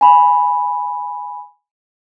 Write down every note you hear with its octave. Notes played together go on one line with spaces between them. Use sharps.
G#5 B5